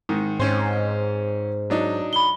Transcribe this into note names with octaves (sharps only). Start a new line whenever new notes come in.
G#2 D#3
G#2 C4 C#4 C5
F#3 D4 D#4
B5 G7